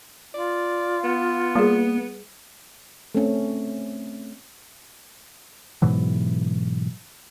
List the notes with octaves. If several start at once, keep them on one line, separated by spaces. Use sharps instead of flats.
F4 D5
B3
G3 A#3 G#4
A3 C4 C#4
G#2 B2 E3 F#3